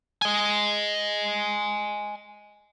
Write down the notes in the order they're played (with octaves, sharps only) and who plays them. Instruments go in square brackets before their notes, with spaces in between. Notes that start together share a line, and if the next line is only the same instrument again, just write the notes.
[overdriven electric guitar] D#5 G#5